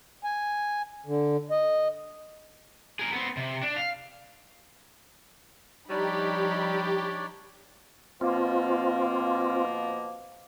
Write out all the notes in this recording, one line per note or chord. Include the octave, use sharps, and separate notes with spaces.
G#5
D3
D#5
G#4 A#4
B3 C4
C3
D4
F5
F3 G3 D4 D#4 G4 C#5 D5 B5
B2 F3 A#3 C4 F4